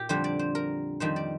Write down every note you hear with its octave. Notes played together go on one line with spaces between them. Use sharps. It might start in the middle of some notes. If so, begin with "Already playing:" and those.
Already playing: A#2 G4
F2 D3 G3 C5
D5
C5
A#4
F2 D#3 G3 C5
D5